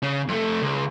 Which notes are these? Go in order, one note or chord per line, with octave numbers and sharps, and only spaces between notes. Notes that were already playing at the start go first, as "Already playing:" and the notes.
C#3
F2 A3
C#2